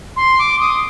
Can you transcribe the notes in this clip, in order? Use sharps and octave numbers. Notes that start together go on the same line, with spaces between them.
C6
D6
D#6